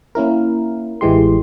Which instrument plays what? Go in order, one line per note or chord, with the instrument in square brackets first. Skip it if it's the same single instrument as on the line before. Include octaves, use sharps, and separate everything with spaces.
[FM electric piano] A#3 C#4 E4 A#4
A1 E3 G#3 G4 C6